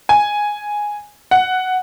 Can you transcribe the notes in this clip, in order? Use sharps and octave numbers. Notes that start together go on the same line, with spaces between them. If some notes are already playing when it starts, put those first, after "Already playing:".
G#5
F#5